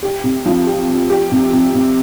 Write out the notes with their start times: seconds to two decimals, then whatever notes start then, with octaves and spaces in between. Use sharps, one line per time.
0.03 G4
0.24 C3
0.46 F3
0.66 G4
0.88 C4
1.10 G4
1.32 C3
1.53 C3
1.75 C3